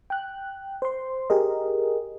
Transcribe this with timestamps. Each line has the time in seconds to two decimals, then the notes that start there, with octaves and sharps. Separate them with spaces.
0.10 G5 F#6
0.82 C5 C6
1.30 G4 G#4 A#4 D#5